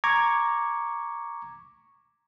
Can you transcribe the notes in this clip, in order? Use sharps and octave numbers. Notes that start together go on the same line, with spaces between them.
A#5 C#6 D6 G#6